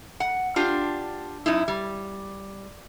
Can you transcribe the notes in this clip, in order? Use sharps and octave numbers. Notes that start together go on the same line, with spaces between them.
F#5
D4 F4 G4
F#2 D#4 E4
G3